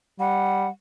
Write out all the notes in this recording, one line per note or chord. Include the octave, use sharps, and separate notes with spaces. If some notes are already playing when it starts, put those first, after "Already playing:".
G3 F#5